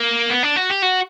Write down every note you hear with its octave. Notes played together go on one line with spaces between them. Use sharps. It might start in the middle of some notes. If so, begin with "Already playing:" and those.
Already playing: A#3
B3
D4
F#4
G4
F#4